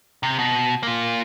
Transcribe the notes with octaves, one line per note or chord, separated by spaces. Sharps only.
C3
B2
A#3 F4